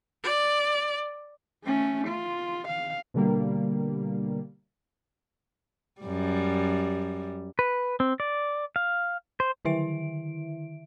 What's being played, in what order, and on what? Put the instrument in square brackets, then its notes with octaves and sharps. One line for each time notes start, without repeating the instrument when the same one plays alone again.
[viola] D5
[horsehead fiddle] A3 C#4
F4
F5
[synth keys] B2 D3 G3 A#3
[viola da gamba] F#2 G3
[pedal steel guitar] B4
C4
D5
F5
C5
[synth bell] D3 D#3 E4 E5 D7